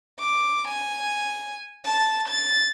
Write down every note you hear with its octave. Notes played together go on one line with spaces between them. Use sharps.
D6
G#5
A5
A6